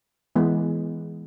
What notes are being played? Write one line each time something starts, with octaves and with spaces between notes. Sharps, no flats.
E3 G#3 B3